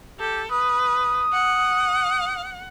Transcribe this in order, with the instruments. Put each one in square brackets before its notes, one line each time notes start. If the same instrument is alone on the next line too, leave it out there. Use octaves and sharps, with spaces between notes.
[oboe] G4 [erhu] A4
[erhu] B4 [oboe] D#6
[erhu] F#5